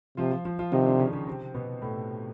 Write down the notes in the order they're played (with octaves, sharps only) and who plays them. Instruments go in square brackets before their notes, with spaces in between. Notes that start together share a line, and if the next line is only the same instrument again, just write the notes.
[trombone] C3 [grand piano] F3 F4
[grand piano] F3 F4
F3 F4
F3 F4
[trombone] C3 [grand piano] D#3 D#4
[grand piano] D3 D4
C#3 C#4
C#3 C#4
C3 C4
B2 B3
A2 A3